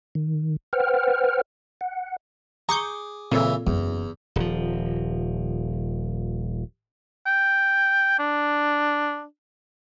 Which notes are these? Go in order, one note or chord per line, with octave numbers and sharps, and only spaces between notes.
D#3
B4 C5 F#5 G5 F6
F#5
G#4 A#5 C#6 D6 G6
A#2 C#3 E3 C4 A4 E5
F#1 E2
D#1 F3
G5
D4